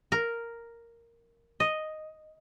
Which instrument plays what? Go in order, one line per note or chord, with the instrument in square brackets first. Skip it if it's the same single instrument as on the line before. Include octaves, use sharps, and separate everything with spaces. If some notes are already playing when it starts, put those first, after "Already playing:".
[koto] A#4
D#5